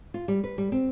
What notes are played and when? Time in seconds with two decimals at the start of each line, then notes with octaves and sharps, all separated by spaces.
0.14 F4
0.28 G3
0.44 B4
0.58 G3
0.72 C4